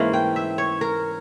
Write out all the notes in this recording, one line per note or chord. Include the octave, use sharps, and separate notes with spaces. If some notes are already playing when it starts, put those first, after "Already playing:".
Already playing: G#2 E3 A#3 C#4 F5
G5
E5
C#5
A#4